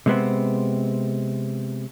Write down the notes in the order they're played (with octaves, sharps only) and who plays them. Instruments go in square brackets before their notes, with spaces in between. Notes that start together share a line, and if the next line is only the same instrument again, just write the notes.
[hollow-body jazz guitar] C3 G#3 B3 C4